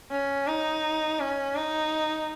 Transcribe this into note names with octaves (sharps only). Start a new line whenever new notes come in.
C#4
D#4
C#4
D#4